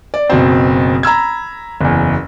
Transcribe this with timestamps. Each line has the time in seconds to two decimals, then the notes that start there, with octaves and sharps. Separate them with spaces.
0.14 D5
0.30 F#1 B2 C4
1.03 A#5 B5 E6 G#6
1.81 F#1 E2